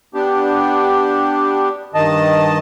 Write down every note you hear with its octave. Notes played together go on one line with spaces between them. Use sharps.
B3 D4 G4
G2 D#3 D#5 A5